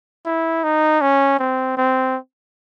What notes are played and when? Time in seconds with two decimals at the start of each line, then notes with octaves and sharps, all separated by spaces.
0.26 E4
0.64 D#4
1.01 C#4
1.40 C4
1.77 C4